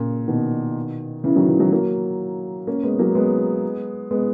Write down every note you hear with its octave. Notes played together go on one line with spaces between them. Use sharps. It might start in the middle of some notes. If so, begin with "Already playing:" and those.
Already playing: A#2 C#3
B2 D#3
C#3 E3
D#3 F#3
C#3 E3
D#3 F#3
F#3 A#3
A#3 C#4
G#3 B3
F#3 A#3
G#3 B3
G#3 B3